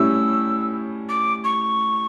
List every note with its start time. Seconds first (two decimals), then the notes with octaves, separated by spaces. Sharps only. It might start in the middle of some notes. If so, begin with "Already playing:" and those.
Already playing: A2 G3 C#4 E4 E6
1.09 D6
1.44 C#6